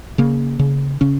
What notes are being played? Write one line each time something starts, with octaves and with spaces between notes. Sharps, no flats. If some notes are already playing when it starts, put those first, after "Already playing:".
C#3 A#3
C#3
C#3 C#4